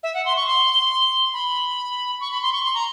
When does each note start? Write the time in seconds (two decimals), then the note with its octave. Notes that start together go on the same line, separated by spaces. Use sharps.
0.03 E5
0.14 F#5
0.26 C6
0.37 C#6
0.47 C6
1.33 B5
2.21 C#6
2.32 B5
2.42 C6
2.53 C#6
2.63 C6
2.74 A#5